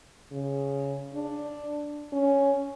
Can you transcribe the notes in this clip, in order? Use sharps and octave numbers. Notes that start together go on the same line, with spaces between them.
C#3
D4
C#4